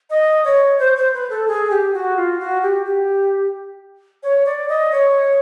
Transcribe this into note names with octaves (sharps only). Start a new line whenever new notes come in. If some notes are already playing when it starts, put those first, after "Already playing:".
D#5
C#5
C5
C5
B4
A4
G#4
G4
F#4
F4
F#4
G4
G4
C#5
D5
D#5
C#5